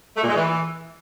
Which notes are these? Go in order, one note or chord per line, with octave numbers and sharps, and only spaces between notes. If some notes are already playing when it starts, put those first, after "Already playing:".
A3
A#2
G#3
E3